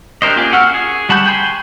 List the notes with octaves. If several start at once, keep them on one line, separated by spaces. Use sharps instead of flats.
D4 G4 A#4 C5 D#5
A#3 C#4 F4 G4 G#4
F#4 F#5 E6 F6
G#4
G3 F#4 A5 B5 G6
G5 G#5 B5 C6